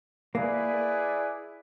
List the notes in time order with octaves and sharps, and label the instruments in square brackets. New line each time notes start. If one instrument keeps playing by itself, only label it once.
[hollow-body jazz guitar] A#3 [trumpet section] E4 G#4 B4 D5